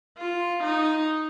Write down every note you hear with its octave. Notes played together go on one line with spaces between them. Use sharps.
F4
D#4